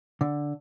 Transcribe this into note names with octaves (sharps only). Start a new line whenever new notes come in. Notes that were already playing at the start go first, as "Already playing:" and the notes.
D3